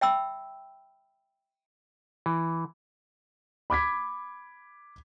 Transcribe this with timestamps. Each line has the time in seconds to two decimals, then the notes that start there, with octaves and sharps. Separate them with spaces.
0.01 E5 G5 B5 E6
2.26 E3
3.70 B5 D6 G#6 B6